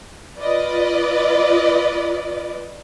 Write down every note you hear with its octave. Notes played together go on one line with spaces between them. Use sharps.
F4 B4 D5 D#5